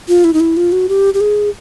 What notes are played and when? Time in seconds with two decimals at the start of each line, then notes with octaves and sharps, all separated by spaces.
0.08 F4
0.24 E4
0.34 D#4
0.40 E4
0.57 F4
0.72 F#4
0.89 G4
1.14 G4
1.21 G#4